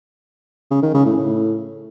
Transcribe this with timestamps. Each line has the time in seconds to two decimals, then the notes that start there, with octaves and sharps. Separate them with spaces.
0.71 C#3
0.82 D#3
0.94 C#3
1.05 A2
1.17 A2